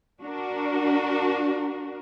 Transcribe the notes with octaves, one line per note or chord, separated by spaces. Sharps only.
D4 F#4 A#4